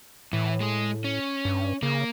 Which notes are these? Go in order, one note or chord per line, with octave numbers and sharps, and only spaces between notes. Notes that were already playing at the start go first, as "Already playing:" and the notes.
A2 E3
G#3 G#4
C#4
G2
C#3 A#3